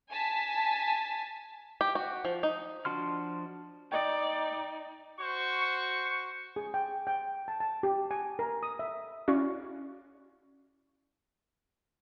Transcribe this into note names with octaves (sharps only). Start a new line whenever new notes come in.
G#5 A5 B6
G4
F#4
F3
D#4
F3 D4 F#4 C6 F6
D#4 D5 D#5 G5
F#4 C5 C#6
G#4
G5
G5
A5
A5
G4
G#5
A#4
D#6
E5
C#4 E4 F#4 D5 F5 C#6